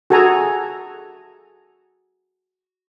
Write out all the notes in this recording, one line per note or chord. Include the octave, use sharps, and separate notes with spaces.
F#4 G#4 A4 G#5 A#5